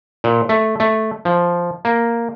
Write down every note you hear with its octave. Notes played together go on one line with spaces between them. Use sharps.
A#2
A3
A3
F3
A#3